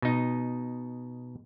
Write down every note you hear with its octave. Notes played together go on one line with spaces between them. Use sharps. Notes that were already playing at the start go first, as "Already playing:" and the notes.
B2 D#4